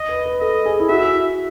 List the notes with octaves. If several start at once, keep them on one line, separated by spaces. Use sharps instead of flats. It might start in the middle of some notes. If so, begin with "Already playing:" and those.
Already playing: D#5
B4
B4
A4 D#5
G#4
E4
F#4 E5